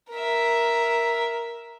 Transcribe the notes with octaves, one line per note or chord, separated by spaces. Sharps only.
A#4 E5